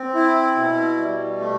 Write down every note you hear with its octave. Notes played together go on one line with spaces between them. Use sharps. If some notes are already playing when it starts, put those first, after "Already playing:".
Already playing: C4
E4
B2
G3
A3